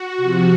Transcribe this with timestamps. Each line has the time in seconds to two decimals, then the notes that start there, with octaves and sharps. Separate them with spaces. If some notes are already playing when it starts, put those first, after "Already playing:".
Already playing: F#4
0.17 C3 F3